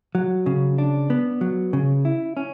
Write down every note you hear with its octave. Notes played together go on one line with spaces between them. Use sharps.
F#3
C#3
D4
B3
F#3
C#3
E4
C#4